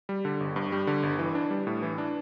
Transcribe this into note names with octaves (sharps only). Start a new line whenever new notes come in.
G3
D3
G1
G2
G3
D3
G1
E3
D4
G3
A2
E3
D4